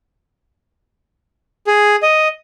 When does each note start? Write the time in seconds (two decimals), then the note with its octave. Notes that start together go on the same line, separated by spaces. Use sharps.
1.67 G#4
2.03 D#5